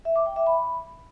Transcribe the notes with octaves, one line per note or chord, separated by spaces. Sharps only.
E5
D6
G5
E5
B5